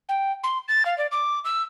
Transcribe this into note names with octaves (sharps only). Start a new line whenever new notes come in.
G5
C6
A6
F5
D5
D6
E6